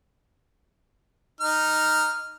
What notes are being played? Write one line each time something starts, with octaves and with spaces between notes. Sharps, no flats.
D#4 F6